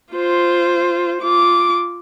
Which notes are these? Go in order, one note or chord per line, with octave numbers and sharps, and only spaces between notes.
F4 C5
F4 D6